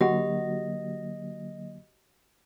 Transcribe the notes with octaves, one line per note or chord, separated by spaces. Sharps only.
D3 F#3 A#3 F#4 G4 D#5 F#5